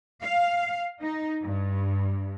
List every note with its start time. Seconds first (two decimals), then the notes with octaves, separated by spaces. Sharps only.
0.23 F5
1.02 D#4
1.43 G2